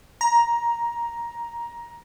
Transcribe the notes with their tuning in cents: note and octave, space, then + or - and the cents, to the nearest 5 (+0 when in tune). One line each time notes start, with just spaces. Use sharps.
A#5 +10